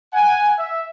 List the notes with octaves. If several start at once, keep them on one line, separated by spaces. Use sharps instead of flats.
F#5 G#5
E5